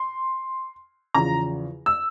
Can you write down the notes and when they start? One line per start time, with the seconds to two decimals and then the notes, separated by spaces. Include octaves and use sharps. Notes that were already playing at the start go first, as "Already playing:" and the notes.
Already playing: C6
1.15 E2 C#3 F3 A#5
1.86 E6